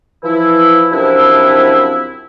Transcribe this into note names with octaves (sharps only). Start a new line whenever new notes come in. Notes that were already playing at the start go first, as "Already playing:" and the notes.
E3 F3 E4
F#2 C3 F3 C4 D4 E4